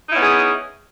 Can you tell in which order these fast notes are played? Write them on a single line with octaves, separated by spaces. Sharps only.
D#4 E4 C#4 B3 G#4